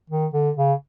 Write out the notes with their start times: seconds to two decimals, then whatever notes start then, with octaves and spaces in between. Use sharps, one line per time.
0.10 D#3
0.33 D3
0.57 C#3